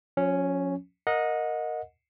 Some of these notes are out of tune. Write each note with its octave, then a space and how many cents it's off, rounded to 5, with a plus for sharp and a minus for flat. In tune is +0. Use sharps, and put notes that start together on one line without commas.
F3 +40 C#4 +0
A#4 +0 D#5 +0 F#5 -30